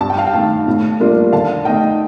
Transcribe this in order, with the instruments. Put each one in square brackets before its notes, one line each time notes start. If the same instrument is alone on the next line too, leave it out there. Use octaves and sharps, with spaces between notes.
[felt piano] G2 [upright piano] A5
[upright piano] G5
F5 A5
G5
[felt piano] D#3 A3 [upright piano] F5 A5
[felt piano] A2
G3 A#3 D4 F4
[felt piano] D3 [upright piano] F5 A5
[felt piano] A3 D#4 [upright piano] D#5 G5